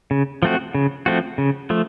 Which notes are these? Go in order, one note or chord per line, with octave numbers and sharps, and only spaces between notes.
C#3
F3 A3 C4 F#4
C#3
F3 A3 C4 F#4
C#3
F3 A3